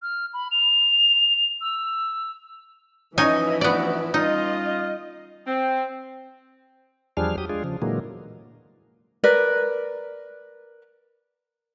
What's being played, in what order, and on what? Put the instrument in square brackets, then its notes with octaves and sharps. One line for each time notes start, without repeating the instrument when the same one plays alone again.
[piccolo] F6
B5
F7
E6
[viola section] E3 F3 E4 [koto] C#4 D#4 G#5 [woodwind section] D#5
[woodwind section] A3 D4 F#4 [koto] B3 D5
[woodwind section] G3 C#4 F4 [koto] D#4 [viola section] D#5
[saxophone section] C4
[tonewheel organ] E2 F3 G3 D4 G#4 F6
F#3 G4 D#6
G#3 D4 F4 G#4
C#3 F3
A#2 D3 E3 F#3 G#3 A#3
[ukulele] A#4 B4 D5